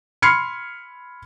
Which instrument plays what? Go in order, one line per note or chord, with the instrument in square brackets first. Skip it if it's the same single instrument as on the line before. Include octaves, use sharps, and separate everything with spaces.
[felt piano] B5 C6 F6 G#6 C7 C#7